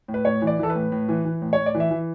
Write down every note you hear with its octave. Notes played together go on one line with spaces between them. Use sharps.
A2
B4
A2 C#5
E3
D5
E3 A4
B4
A2
A2
E3
E3
A2
C#5
A2
D5
E3
E5
E3